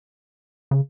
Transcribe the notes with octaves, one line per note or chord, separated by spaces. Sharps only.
C#3